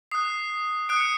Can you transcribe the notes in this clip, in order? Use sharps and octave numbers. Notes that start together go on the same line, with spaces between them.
D#6 F#6 C7
D#6 F#6 D7
C#7